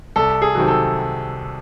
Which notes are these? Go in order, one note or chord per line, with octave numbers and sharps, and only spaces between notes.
C2 A4
G#4
C3 D#3 F#3
A4